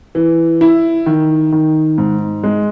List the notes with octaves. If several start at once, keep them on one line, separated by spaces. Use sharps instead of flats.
E3
E4
D#3
D#3
G#2
G#3